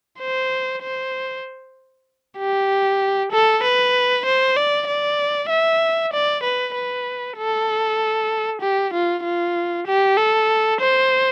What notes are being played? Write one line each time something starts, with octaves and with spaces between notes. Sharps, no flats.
C5
C5
G4
A4
B4
C5
D5
D5
E5
D5
B4
B4
A4
G4
F4
F4
G4
A4
C5